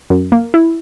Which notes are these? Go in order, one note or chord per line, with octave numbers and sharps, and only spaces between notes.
F#2
A#3
E4